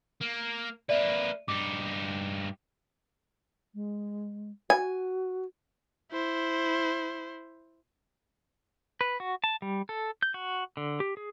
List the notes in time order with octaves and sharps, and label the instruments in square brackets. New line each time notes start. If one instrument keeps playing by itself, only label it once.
[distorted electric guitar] A#3
[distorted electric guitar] A#3 B4 [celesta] D5 E5
[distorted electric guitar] G2 D#4 [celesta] D6
[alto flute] G#3
[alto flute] F#4 [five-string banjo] G#5
[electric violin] E4 C5
[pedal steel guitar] B4
F#4
A5
G3
A4
G6
F#4
D3
G4
G#4